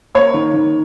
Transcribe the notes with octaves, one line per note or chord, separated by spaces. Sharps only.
A#3 C#5
D#3
D#3